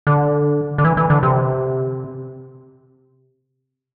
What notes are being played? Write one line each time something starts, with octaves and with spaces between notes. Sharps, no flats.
D3
D3
E3
E3
D3
C3